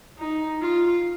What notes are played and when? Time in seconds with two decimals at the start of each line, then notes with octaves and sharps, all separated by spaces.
0.19 D#4
0.61 F4